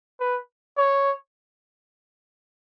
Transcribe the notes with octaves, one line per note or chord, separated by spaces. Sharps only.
B4
C#5